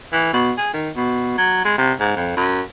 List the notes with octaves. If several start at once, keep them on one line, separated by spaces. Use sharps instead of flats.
E3
B2
G#4
D#3
B2
F#3
G#3
C3
G#2
F2
F#2